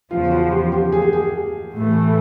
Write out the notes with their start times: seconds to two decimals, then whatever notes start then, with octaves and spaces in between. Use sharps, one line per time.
0.11 E2 C#3 F3 F4
0.31 F#4
0.52 G4
0.72 G4
0.92 G#4
1.02 G4
1.13 G#4
1.73 A2 E3 A3